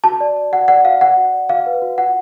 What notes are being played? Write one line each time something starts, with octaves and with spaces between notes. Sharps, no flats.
F#4 A5
D5
D5
F#4 F#5
D5 F#5
F#4 F5
D5 F#5
F#4
D5
F#4 F5
B4
F#4
F4 F#5